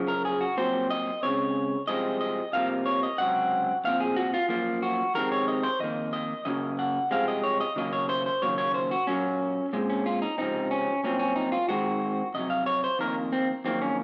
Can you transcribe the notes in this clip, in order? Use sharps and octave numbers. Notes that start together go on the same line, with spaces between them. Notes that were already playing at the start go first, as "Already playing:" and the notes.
Already playing: F#2 C#3 F3
A#4
G#4
F#4
C2 A#2 F#3 C4 C5
D#5
C#2 C#3 F#3 C4 C#5
C2 C3 F3 G#3 C4 D#5
D#5
C2 C3 F3 A#3 F5
C#5
D#5
C#2 C3 F#3 C4 F#5
C2 A#2 F3 C4 F5
G#4
F#4
F4
F#2 F3 A#3 F4
F#4
F2 C3 D#3 G#3 C4 A#4
C#5
D#5
C5
F2 D#3 A#3 D#5
D#5
F#2 C#3 F#3 A#3 D#5
F#5
C2 C3 F3 G#3 C4 F5
D#5
C#5
D#5
D#2 C#3 F#3 A#3 D#5
C#5
C5
C5
D#2 C#3 F#3 A#3 C#5
C#5
C5
F#4
A#2 F#3 A#3 C#4
A#2 G#3 C4
C#4
F4
D#4
C#2 C3 F3 C4 D#4
C#4
C2 A#2 F#3 C4 C#4
C#4
D#4
F4
G#2 D#3 G#3 C4 F#4
F2 C3 F#3 D#5
F5
C#5
C5
F2 D#3 A#3 A#4
C4
F2 D#3 F#3 A#3 C4
C#4